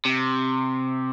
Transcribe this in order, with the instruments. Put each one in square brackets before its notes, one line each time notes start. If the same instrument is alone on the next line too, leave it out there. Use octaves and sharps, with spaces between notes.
[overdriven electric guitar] C3